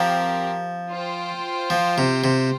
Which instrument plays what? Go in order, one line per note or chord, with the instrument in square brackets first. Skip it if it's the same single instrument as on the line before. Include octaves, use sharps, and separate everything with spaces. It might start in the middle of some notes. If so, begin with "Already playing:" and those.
Already playing: [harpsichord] F3 [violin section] C4 G4 A#4
[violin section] F4 C5 G5
[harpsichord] F3
C3
C3